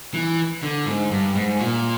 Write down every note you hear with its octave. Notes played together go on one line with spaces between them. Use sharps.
E3
D3
G#2
G2
G#2
A#2